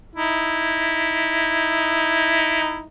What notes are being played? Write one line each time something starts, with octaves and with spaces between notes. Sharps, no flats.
D#4 E4